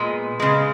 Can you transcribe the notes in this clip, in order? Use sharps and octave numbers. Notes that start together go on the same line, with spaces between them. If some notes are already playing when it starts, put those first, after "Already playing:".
Already playing: A#2 G#3 B3
C#3 G#3